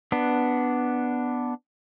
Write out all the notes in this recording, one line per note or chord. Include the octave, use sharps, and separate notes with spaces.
B3 D4